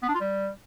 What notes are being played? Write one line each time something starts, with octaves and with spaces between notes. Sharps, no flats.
B3
D4
F4
G3